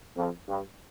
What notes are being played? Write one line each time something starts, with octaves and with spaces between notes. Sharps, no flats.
F2
G2